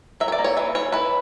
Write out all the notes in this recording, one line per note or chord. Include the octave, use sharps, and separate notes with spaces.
F#3 E5
C#5
D5
A#3
C#5
E3 E5
E3 C#5
E4 B4